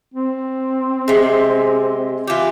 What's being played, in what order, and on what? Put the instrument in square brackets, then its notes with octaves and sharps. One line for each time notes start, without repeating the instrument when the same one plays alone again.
[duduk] C4
[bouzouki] C3 G#3
[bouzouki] E3 G4 [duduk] F4